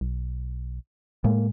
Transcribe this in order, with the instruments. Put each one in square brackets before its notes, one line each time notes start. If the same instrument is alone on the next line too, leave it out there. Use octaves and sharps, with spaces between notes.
[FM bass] B1
[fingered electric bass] A2 G#3 [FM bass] A#3